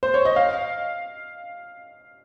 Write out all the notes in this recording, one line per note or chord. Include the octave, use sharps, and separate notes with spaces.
C5
C#5
D#5
F5